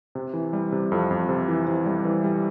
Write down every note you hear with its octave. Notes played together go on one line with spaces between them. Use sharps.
C3
E3
G3
C3
F2
F2
C3
E3
C3
G3
E3
G3